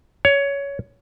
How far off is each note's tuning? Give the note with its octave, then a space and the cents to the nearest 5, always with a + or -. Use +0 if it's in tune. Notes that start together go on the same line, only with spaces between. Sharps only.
C#5 +15